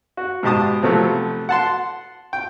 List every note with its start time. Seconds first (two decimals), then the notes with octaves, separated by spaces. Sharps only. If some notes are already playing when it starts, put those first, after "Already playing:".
0.17 F#4
0.43 G#2 B2 G4 A5 D#6
0.83 C3 F3 F#3 A3 B3
1.49 F#5 A5 C6
2.33 G5